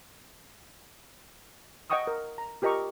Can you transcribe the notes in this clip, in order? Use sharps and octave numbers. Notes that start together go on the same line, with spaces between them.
D#5 F#5 G5 C#6 D#6 E6
A#4
A#5
F4 G4 A#4 D#5 A#5 C#6